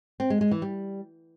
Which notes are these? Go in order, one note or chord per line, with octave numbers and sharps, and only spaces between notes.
C4
G#3
G#3
E3
G3